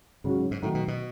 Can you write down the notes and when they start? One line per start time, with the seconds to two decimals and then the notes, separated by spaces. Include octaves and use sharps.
0.24 G#2 C#3 F#3 C#4 F#4
0.51 G#2
0.62 A2 D#3 F#3 A3 D#4
0.74 B2
0.88 B2